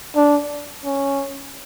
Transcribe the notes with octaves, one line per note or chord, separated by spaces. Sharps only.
D4
C#4